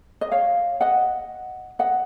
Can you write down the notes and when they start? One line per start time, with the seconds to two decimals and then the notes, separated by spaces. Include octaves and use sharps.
0.21 D#5
0.31 C#5 F5
0.81 D#5 F#5
1.79 D#5 F#5